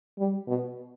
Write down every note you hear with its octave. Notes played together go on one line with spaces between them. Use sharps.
G3
B2